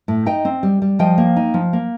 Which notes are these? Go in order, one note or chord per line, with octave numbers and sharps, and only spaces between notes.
A2
D#4 D#5 G5
C4
G3
G3
F3 D#5 G5
A#3
D#4
F3
A#3